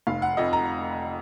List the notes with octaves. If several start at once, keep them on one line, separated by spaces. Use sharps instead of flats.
F1 F5
F#5
F2 D#5
A#5